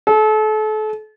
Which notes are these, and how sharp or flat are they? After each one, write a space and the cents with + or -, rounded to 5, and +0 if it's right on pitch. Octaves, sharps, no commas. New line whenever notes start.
A4 -35